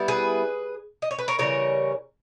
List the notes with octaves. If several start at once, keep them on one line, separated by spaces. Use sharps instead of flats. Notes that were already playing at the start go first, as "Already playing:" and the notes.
Already playing: G3 B3 E4
G#4 B4
D#5
C#5
B4
A#4 C#5
C#3 E3 G3 C#4 A#4 C#5